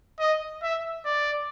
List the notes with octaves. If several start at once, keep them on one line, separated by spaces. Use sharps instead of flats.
D#5
E5
D5